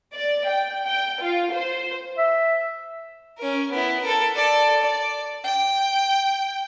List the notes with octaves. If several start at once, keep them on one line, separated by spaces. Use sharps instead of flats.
D5
G5
G5
F4
C5
E5
C#4 A#4
B3 E4
A4 A#4
A4 D5
D5
G5